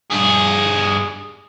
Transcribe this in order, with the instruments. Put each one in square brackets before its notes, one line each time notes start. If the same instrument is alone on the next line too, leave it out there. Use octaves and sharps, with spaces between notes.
[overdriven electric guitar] G2 G#4